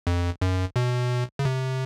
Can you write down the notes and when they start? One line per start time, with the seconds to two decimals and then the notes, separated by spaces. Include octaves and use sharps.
0.07 F2
0.42 F#2
0.76 B2
1.39 C#3
1.45 C3